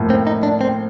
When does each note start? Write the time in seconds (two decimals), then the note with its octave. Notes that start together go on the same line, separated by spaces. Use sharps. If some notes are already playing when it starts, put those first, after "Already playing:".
Already playing: A2 F3 A#3
0.10 C4
0.27 D#4
0.43 D4
0.61 C4